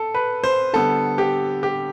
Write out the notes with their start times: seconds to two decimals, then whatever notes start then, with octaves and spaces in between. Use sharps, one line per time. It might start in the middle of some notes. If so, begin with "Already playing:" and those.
Already playing: A4
0.14 B4
0.44 C5
0.73 D3 G3 B3 A4
1.18 G4
1.63 G4